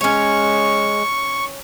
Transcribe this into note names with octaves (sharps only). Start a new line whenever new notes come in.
G#3 C#4 C#5 C#6